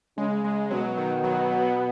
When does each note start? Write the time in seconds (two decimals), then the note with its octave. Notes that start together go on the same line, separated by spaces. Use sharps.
0.17 C#3 G#3
0.44 G#3
0.71 B2 F#3
0.98 D#3
1.24 F#3
1.51 B3